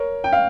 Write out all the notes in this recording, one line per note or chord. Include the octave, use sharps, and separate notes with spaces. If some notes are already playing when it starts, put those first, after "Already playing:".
Already playing: A#4 C#5
G5
F5